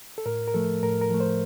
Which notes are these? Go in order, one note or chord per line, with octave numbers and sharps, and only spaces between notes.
A4
A2 A#4
A#4
F3 A3 A4
A2 A#4
A#4
F3 A3
C5